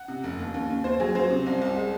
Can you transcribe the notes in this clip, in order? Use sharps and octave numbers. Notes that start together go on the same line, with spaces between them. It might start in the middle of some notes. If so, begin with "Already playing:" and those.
Already playing: F#5
C3
F1
D#2
D#2
D#2
D#2 C5
F#3 G#4
F#3 C5
C3
C2
C2
G#3